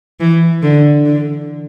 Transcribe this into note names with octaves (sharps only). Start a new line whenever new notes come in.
E3
D3
D3